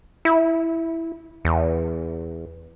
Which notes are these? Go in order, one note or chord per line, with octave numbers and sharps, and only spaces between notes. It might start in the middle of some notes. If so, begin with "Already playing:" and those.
E4
E2